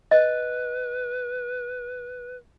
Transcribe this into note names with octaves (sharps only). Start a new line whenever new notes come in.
B4 D#5